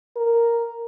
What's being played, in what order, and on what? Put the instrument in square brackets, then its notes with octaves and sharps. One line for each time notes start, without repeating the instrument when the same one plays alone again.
[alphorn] A#4